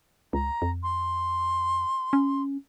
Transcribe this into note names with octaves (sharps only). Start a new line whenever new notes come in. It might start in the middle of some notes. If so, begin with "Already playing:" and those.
C#2 A#5
F2
C6
C#4